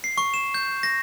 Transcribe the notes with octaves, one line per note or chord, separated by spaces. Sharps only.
C7
C#6
E7
G6
A#6